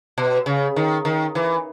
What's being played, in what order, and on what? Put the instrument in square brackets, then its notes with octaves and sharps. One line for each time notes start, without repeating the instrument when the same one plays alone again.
[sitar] B2
C#3
D#3
D#3
E3